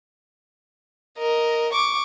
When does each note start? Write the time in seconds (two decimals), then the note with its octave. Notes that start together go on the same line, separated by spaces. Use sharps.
1.18 A#4 D#5
1.73 C#6 D6